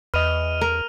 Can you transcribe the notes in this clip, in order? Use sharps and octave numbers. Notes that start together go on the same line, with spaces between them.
E2 B4 D#5 F6 D#7 F7
A#4